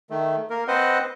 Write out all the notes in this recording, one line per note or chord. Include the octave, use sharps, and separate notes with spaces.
D#3 A3
A#3 A#4
C4 B4 C5 D#5 F#5